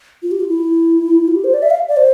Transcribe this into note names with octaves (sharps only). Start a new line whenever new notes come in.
F4
G4
F4
E4
F4
G4
C5
D5
E5
F5
D5
C5